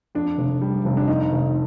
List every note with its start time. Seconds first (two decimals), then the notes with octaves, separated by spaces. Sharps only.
0.15 F2 D4
0.38 F1
0.61 G3
0.85 F1
0.97 D4
1.08 F2 D#4
1.32 F1